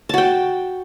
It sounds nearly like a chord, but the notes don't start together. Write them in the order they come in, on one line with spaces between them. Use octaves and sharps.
A5 F#4 G5